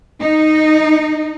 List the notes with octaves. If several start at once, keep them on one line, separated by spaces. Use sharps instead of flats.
D#4